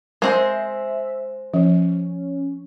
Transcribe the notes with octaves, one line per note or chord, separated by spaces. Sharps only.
G#3 C4 A#4 C5 E5
F3 C#4